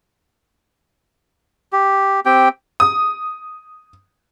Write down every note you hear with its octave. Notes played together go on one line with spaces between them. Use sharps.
G4
C4 G4 G5
D#6